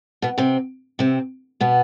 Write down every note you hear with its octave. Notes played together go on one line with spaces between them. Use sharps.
B2 B3
C3 C4
C3 C4
B2 B3